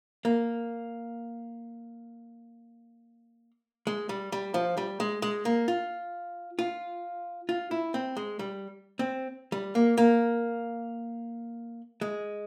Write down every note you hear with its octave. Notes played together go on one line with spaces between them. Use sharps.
A#3
G#3
G3
G3
F3
G3
G#3
G#3
A#3
F4
F4
F4
E4
C4
G#3
G3
C4
G3
A#3
A#3
G#3